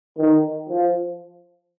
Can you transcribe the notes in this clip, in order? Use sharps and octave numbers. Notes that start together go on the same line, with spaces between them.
D#3
F3